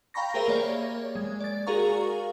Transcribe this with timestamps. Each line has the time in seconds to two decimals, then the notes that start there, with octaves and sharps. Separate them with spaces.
0.14 F5 G5 A#5 B5 C#6 A#6
0.34 G4 G#4 A#4 C5 E5 A#5
0.48 A#3 C#5 D5
1.15 G#3
1.41 D5 A6
1.67 F#4 G#4 A#4 F5 A#5 C#6